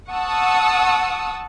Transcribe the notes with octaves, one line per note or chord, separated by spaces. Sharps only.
F#5 A5 C#6 D#6 E6